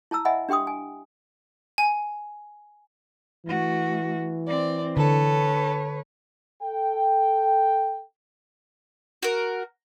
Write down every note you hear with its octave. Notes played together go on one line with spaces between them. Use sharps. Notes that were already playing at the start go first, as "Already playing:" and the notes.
E4 A5 A#5 E6
D#5 E5 F#5 G#5 B5
D4 G4 G5 C6 D#6
G#5
G#5
E3 A3 F#4
C4 D5
D3 A4 B4 C#5
A4 G5
F#4 A#4